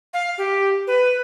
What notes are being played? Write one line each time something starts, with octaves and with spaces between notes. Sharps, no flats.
F5
G4
B4